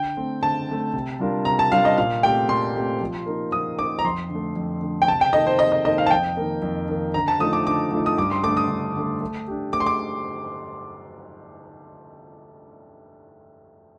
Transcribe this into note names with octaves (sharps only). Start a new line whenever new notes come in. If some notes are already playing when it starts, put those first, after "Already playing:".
Already playing: D3 G5
A3 C4
D3 A5
A3 C4
C3
G3 D4 F4 A#4
C3 A#5
A5
G3 D4 F4 A#4 F5
D#5
A#2 F5
A3 C4 G4 G5
A#2 C6
A3 C4 G4
F3
A#3 D#4
F3 D#6
A#3 D#4 D6
A#5
F2 C6
D3
A3
F2
D3 A3
G5
C3 A5
G5
D#3 A#3 D#4 A4 D#5
C5
C3 D#5
D#5
D#3 A#3 D#4 A4 D#5
F5
A5
F2 G5
D#3 A#3
F2
D#3 A#3
D3 A#5
A5
F3 A3 D#4 D#6
D6
D3 D6
F3 A3 D#4
D#6
G2 D6
C6
D3 A3 D6
D#6
G2
D3 A3
A3
D4 G4
A3 D6
C6
D6